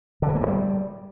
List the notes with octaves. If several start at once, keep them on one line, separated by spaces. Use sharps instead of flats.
D3
E3
A#3
G2
G3